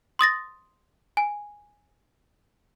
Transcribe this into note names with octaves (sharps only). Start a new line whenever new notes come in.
C6 D#6 A6 A#6
G#5